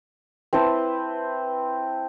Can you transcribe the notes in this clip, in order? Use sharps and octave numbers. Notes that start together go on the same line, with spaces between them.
C4 E4 B4 A5